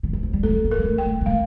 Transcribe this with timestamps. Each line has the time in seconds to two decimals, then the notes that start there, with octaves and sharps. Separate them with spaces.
0.03 D3
0.13 E3
0.23 F3
0.33 G3
0.43 A3 A4
0.64 A#3
0.71 A#4
0.78 G3
0.84 A3
0.98 G5
1.06 A3
1.21 G3
1.26 A3 F5